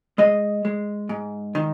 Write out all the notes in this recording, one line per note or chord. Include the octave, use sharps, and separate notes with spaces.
G#3 D#5
G#3
G#2
D#3